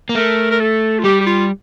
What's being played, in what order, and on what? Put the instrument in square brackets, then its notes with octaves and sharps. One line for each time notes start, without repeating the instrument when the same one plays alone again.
[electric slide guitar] A#3
[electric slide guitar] A3 [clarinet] A#4
[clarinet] A#4
A4
F4
[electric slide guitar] G3 [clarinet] G4
[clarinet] G4
F4